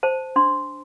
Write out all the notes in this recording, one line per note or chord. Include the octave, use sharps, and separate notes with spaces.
C5 A5
D4 C6